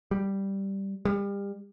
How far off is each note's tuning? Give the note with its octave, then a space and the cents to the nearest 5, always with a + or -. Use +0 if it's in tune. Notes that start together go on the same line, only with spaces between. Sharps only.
G3 -5
G3 +35